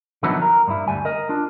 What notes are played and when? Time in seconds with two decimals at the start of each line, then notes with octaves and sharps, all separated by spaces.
0.23 D3 F3 F#3 B3 D#4 E4
0.42 A#4
0.68 G2 E4
0.88 D2 G3 G#5
1.05 A#4 D#5
1.29 D4 F4